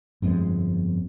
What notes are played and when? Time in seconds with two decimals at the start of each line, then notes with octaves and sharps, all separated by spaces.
0.22 G1 F2 A#2 G#3